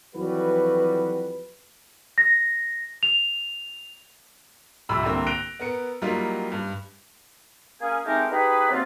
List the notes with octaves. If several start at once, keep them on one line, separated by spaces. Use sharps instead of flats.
F2 E3 F#3 G3 F#4 B4
A#6
F7
C2 F2 C3 B5 E6
C2 D3 A#3 C4
F#6 A#6 D7 F7 G7
B3 A#4 C#7
F#3 G3 A#3 D#4 F4
G2
A#3 C#4 G#4
G#3 A3 C4 D#4 G4 A#4
D#4 G4 G#4 B4
C3 F#3 A#3 C4 F4